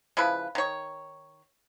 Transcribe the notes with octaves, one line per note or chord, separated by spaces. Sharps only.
C#3 F3 E4 B4
D#3 C#5